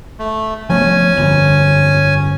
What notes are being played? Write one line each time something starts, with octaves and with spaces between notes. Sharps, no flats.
A3
F3 A3 B3 C#4 G#5
G1 F2